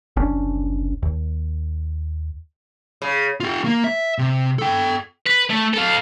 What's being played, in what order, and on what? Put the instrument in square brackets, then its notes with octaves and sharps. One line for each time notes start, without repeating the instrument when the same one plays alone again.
[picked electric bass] F#1 C2 C#4 D4
D#2
[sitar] C#3
[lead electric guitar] F4 G4
A#3
E5
C3
A4 G5
[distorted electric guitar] B4
A3
A4 F5